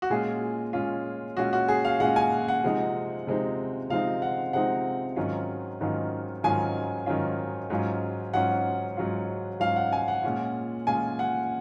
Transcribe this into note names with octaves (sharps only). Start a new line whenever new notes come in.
F#4
A#2 G#3 C#4 F4 G#4
A#2 G#3 C#4 F4
A#2 G#3 C#4 F4 F#4
F#4
G#4
F5
A#2 G#3 C#4 F4 F#5
G#5
F#5
C3 F3 G#3 C4 D#4
C3 F3 G#3 C4 D#4
C3 F3 G#3 C4 D#4 F5
F#5
C3 F3 G#3 C4 D#4 F#5
G#2 D#3 F#3 C#4 F4
G#2 D#3 F#3 C#4 F4
G#2 D#3 F#3 C#4 F4 G#5
G#2 D#3 F#3 C#4 F4
G#2 F#3 C#4 F4
G#2 F#3 C#4 F4 F#5
G#2 F#3 C#4 F4
G#2 F#3 C#4 F4 F5
F#5
G#5
F#5
A#2 G#3 C#4 F4
A#2 G#3 C#4 F4 G#5
F#5